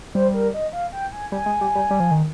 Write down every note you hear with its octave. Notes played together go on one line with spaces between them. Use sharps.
G3 C5
A#4
D#5
F5
G5
G#5
G3 G#5
G#3
G3
G3
G3
F3
D#3